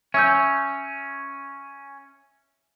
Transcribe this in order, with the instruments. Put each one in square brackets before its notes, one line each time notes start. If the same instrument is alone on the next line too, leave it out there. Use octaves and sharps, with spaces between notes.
[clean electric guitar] C#4 [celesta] E5 E6 G6